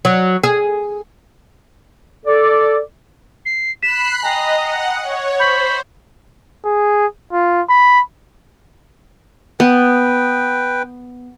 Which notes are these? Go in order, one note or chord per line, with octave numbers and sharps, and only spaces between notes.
F#3
G#4
A4 D5
C7
B5 F#6 B6 C7 E7
D#5 G5 G#5 A#5
F#5
C#5
C5 B5 C#6 G6
G#4
F4
B5
B3 B4 G5